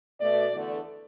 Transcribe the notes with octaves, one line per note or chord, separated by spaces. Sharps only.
B2 A3 D5
E2 D3 A3